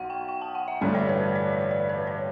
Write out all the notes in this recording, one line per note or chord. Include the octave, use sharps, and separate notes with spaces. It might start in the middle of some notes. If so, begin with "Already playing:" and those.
Already playing: B1 F#5
G5
G5
A5
F#5
E5
A1 G2 D3 A3 E4 D5
C#5
B4
D5
D5
D5
B4
C#5